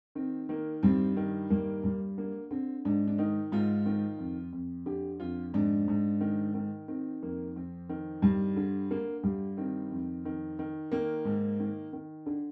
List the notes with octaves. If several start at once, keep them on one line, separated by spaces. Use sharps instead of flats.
D#3 C4
D#3 A#3
G2 C4
D#3
G2 A#3
G2
D3 A#3
D3 C4
G#2 D4
D4
D#3 D#4
G#2 F4
D#3
F2
F2
D3 G4
F2 F4
G#2 D4
G#2
D#3
D#3
D#3 C4
F2 A#3
F2 C4
D#3
G2
D3
D3 A#3
G2 G4
D#3 C4
F2
D#3
D#3
D#3 A#3
G#2
D#3
D#3
D3 D4